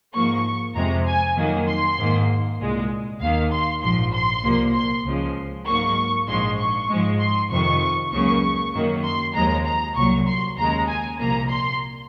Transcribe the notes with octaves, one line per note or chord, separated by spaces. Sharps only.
G#2 F3 A#3 C#6
F2 C3 F3 G#3 A#5
G#5
F2 D#3 F#3 A#3
C6
G#2 D#3 A#3
C2 A#2 G#3
D#2 D#3 A#3 F5
C6
A#1 G#2 F3 C6
C6
C2 A#2 F3 A#3
C6
C#2 C#3 F3 G#3
G#2 F#3 A#3 C#6
A#1 G#2 F3 G#3 C6
C#6
G#2 F3 G#3
C6
F2 C3 D#3 C#6
C#2 C#3 F#3 A#3 C#6
F#2 D#3 F#3 A#3
C6
D#2 C#3 F3 G#3 A#5
A#5
C2 A#2 F#3 C#6
C6
D#2 C#3 G#3 A#5
G#5
C2 A#2 F3 A#3 A#5
C6